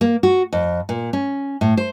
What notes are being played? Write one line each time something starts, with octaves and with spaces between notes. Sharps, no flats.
A#3
F#4
F2
A#2
C#4
A2
C5